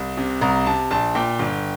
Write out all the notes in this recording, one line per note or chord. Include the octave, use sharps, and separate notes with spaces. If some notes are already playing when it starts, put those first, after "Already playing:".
Already playing: C2
C3
C2 A#5
C3 A5
A#1 A5
A#2 G5
G1